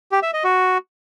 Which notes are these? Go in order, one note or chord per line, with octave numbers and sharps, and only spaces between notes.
G4
E5
D#5
F#4